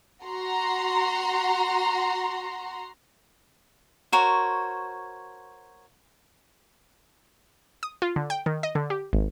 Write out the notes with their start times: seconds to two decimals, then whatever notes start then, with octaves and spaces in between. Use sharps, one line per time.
0.24 F#4 A#5 C6
4.12 F#4 A#4 C5 C#5
7.83 D#6
8.02 F4
8.16 D3
8.30 G5
8.46 D#3
8.63 D#5
8.75 D3
8.90 G4
9.13 G#1